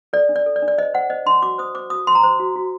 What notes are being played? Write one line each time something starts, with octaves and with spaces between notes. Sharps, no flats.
A4 D5
D4
D5
A4
D5
D4
D5
C5 D#5
C5 F#5
C5 D#5
D4 C6
F#4 D6
C5 D#6
C5 D6
F#4 D#6
C5 C6
A#5
C5 C6
F#4
F#4